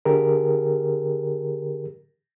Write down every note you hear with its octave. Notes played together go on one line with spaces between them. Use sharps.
D3 G4 G#4 A#4